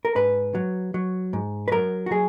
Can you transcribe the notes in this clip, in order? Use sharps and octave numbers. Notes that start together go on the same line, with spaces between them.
A#4
G#2 B4
F#3
F#3
G#2
B4
F#3 A#4
F#4
F#3 G#4